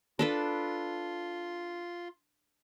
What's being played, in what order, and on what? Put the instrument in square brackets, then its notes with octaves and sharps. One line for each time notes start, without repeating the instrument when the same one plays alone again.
[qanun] D4 A4 B4 [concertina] F4 C6